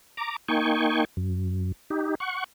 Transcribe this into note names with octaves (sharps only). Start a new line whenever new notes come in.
A#5 D6
A#3 D#4 G5 G#5 C#6
F#2
D#4 G4
F#5 C#6